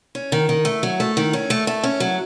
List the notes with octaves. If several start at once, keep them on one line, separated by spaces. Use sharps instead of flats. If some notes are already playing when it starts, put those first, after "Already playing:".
C#4
D#3
D#3
A3
F#3
A3
D#3
C#4
A3
A3
C#4
F#3